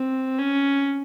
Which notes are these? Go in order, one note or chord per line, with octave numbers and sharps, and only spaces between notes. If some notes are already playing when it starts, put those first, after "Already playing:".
Already playing: C4
C#4